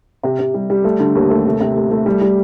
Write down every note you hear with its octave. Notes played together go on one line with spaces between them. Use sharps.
C3
C3
G3
G3
A3
D3
D#2
A3
C3
C3
A3
A3
G3
G3